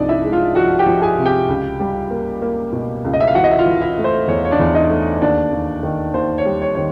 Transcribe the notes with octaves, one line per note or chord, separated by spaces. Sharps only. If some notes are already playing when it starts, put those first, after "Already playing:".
Already playing: C2 F3 D4 D#4 D5 D#5
E4 E5
G#3
F4 F5
F3 F#4 F#5
G4 G5
F3
G#4 G#5
C3
G4 G5
C#2
G3
A#3
A#3
B2
C#2
D#5
E5
F5
E3 F#4 F#5
D#5
E5
F4 F5
E3
E4 E5
A3
C5
E2 C#5
C#5
D4 D5
E2
D#4 D#5
A3
D#2 D4 D5
D#2
D#3
D#2 C5
C#5
G3
C#5
D#3 C#5